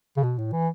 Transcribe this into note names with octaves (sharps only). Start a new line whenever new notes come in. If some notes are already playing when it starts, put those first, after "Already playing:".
C#3
B2
A2
E3